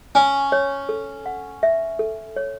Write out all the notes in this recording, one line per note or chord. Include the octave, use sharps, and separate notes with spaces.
C#4 G#5
C#5
A4
F#5
E5
A4
C#5